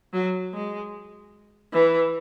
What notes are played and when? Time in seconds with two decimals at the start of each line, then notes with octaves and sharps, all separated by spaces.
0.13 F#3
0.54 G#3
1.73 E3